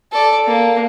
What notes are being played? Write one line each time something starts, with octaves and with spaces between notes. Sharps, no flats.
A4 D5
A#3